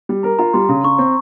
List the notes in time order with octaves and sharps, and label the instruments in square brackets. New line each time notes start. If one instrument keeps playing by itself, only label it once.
[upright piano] G3
[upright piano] A#4 [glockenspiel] A#5
[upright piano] F4 [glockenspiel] A#5
[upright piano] G3 [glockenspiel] C6
[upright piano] C#3
[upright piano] C#3 [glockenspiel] C#6
[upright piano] C4